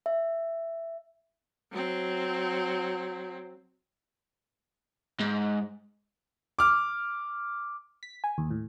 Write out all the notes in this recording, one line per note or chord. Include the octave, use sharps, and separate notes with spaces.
E5
F#3 C4
G#2
D6 F6
B6
G#5
D#2
A2